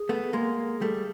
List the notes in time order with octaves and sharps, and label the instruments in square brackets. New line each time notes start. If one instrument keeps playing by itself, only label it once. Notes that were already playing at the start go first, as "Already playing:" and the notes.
Already playing: [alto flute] G#4
[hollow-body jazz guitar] A3 B3
[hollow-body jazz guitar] G#3 A#3 [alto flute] G#4
[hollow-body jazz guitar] G3 A3